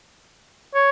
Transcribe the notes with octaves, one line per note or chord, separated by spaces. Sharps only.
C#5